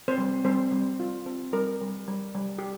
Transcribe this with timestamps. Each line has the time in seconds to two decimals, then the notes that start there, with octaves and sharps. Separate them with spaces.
0.08 C4 C5
0.18 G3
0.45 G3 C4 C5
0.72 G3
1.00 F4
1.26 C4
1.53 G3 A#4
1.81 G3
2.08 G3
2.35 G3
2.58 G4